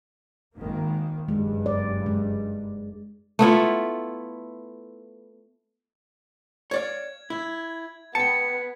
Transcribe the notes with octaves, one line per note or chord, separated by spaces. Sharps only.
G#1 D#3 A#3
F#1 G2 G#3
D5
G#3
A3 B3 E4 F4
C#5 D5 F5 G#6
E4
B3 B4 G5 A5 C#7